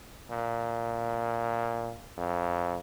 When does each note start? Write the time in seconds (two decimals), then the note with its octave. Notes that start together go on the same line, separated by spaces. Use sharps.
0.31 A#2
2.17 F2